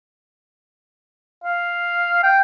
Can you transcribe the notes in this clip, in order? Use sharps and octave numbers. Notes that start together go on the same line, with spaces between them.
F5
G5